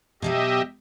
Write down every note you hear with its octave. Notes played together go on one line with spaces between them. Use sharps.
B2 F#3 G3 G4 D#5 E5